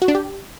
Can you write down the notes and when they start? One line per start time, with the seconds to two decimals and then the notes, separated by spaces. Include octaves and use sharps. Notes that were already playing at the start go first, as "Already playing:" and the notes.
0.02 F#4
0.08 D4
0.15 G4